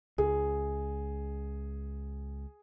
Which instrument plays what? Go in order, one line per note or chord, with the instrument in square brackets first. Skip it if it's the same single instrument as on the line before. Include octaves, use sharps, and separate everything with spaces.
[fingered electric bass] C#2 [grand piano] G#4